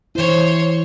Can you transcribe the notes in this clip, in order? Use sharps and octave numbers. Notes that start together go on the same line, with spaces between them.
E3 E4 C5 C#5